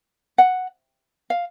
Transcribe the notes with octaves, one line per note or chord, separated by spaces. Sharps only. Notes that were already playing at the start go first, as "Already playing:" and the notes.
F#5
F5